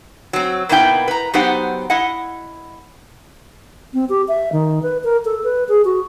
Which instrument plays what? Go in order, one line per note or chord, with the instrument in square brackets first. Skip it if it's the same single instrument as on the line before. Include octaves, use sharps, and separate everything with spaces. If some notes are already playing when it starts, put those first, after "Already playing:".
[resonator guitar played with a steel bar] F#3 C4
B2 A#3 B3 D#4 E4 G5
B4 A#5
F#3 B3 D#4 G4 C5 F#5
E4 D#5 F#5
[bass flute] C4
G4
E5
D#3
B4
A#4
A4
B4
G#4
F#4